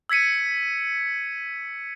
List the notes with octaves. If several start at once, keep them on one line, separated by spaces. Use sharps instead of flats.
E6 G#6 B6 C#7 D#7